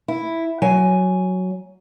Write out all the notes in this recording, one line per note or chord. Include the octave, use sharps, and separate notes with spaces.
E4
F#3 G#5